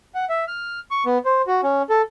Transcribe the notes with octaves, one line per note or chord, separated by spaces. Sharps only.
F#5
E5
F6
C#6
B3
C5
F#4
C#4
A4